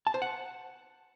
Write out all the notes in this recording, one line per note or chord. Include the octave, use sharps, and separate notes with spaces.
A5
C5
F#5